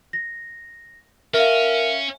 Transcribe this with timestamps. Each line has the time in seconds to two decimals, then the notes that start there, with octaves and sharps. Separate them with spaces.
0.13 A#6
1.34 C#4 A#4 E5 F5